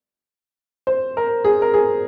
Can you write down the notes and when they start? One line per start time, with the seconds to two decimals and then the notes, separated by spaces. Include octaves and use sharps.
0.87 C5
1.17 A#4
1.45 G#4
1.62 A#4
1.74 G#4